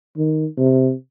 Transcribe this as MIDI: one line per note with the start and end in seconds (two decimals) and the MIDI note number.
0.17 0.45 51
0.58 0.93 48